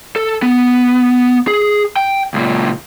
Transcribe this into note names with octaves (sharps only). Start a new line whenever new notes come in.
A4
B3
G#4
G5
C#2 A#2